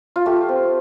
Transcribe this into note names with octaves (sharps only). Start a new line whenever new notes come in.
F4
A3 G4
C4